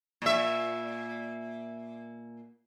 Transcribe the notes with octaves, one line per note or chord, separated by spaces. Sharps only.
A#2 E5